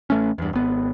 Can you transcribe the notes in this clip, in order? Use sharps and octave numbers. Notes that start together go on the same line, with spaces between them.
A1 A3 C#4
E2 G2
G#1 B3